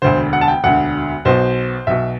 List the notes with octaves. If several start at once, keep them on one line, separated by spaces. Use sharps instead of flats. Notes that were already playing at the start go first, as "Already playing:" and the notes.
E1 D2 D3 C5
F#5
A5
G5
E1 D2 D3 F#5
B1 B2 C5
B1 B2 E5